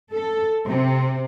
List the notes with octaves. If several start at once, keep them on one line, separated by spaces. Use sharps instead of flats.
A4
C3